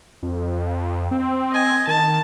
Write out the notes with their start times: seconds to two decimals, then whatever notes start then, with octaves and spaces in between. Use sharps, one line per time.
0.23 F2
1.11 C4
1.52 D#5 G#5
1.87 D#3 A5